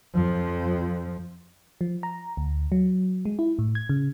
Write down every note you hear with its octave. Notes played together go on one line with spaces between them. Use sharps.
F2 F3
F3
A#5
D2
F#3
G#3
E4
A2
G#6
C#3